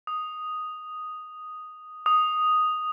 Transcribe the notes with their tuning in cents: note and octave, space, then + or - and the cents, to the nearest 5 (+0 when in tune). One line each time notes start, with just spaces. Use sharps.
D#6 +0
D#6 +0